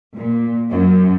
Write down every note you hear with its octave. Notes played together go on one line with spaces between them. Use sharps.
A#2
F#2